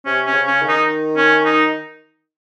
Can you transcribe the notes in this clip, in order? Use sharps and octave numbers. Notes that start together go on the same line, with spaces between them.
C3 C#4
C#4
C#3
C#4
D#3
D#4
C#4
D#4